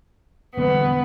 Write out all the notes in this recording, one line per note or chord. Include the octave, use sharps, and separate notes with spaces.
E1 D3 G3 B3